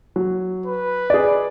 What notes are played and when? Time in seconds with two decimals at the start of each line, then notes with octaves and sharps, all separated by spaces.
0.16 F#3
0.66 B4
1.10 G#4 D5